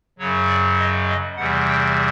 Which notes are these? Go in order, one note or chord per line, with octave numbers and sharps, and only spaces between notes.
F#2 C#3 F#3 C#5
D5
D#5
D#5
E2 C3 E3 G3 F#5
G5